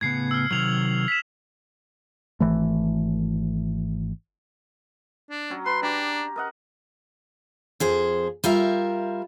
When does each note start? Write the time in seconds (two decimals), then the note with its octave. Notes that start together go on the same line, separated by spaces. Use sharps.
0.01 A2 C#3 B3 G#6 C7 C#7
0.31 E6 F6
0.51 C3 D#3 F#3 F6 F7 F#7
1.08 B6 E7
2.40 G#1 E3 A3
5.30 D4
5.50 F#3 C#4
5.66 B4 C6
5.83 D4 G4 A#5
6.36 A#4 D#5 F#5
7.80 F2 G#4 C5
8.44 G3 F4 A#4 E5